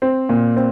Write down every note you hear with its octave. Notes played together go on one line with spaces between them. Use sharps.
C4
A#2
C4